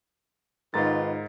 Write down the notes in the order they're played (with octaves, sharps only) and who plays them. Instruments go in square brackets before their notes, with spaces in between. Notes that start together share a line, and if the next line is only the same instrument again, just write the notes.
[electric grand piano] G#2 A#5 A6 [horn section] D#3 F4 B4